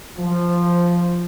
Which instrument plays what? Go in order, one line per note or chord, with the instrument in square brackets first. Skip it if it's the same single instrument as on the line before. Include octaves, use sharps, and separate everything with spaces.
[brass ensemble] F3